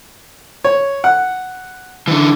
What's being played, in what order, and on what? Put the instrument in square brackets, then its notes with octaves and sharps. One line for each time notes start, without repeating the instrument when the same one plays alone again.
[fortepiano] C#5
F#5
[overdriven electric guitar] D3 E3